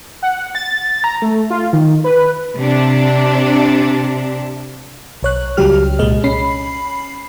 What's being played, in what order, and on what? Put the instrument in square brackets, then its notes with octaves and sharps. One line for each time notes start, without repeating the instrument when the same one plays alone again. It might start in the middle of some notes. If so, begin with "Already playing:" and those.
[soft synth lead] F#5
A6
A#5
A3
F4
D#3
B4
[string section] C3 D4
[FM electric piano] B1 C#5 F#6
C#2 C#3 F#3 G3 G4 F6
C2 A#2 G#3 D#5
C#4 B5 C7